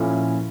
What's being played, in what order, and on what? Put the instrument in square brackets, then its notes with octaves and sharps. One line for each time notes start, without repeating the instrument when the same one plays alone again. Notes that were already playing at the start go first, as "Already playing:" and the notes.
Already playing: [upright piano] A#2 F3 C#4 E4 [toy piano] A4